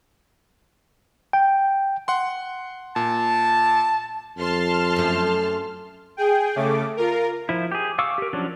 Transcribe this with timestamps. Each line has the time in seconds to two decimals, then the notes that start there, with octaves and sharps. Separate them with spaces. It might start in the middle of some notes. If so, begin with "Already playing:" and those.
1.33 G5
2.08 F#5 C6
2.96 A#2 A5
4.38 F2 A5 C6 F6
4.96 F#2 A3
6.17 G#4 G5
6.56 C#3 A3 D6
6.97 F4 A#4
7.49 F3 E4
7.72 G4 G#4
7.99 F5 C#6 D6 E6
8.18 G4 A#4
8.33 F3 F#3 C#4 D4